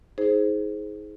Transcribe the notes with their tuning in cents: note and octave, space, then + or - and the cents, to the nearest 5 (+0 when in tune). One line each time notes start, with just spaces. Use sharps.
D#4 +40 G#4 +15 C5 +0